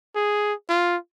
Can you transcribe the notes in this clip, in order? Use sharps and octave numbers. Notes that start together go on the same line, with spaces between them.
G#4
F4